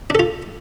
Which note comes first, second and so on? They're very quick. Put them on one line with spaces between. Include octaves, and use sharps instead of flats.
D4 A4 F4